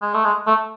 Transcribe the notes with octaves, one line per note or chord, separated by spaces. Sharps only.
G#3
A3
G#3
A3